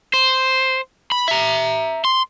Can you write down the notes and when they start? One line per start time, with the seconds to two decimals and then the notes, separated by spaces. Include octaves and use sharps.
0.14 C5
1.12 B5
1.28 E5 A#5
2.05 C6